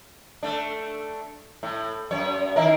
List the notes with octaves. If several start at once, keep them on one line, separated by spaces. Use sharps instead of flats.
A3 D4
A2
F#2 C#5
D#3 E4 A#4